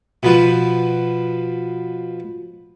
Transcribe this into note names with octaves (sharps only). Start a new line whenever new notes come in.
B2 F3 B4